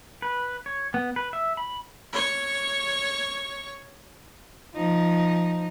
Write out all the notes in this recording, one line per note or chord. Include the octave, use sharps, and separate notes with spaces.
B4
C#5
B3
B4
E5
B5
C#5 C#6
F3 D#4